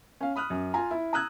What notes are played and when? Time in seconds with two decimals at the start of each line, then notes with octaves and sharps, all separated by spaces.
0.21 C#4 F5
0.36 B5 D#6 F6 F#6
0.50 F#2
0.74 F4 G#5 A#5
0.91 E4
1.13 A#5 D#6 E6 F#6 G#6